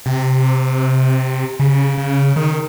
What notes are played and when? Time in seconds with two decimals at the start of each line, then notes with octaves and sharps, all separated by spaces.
0.06 C3
1.60 C#3
1.98 C#3
2.36 D#3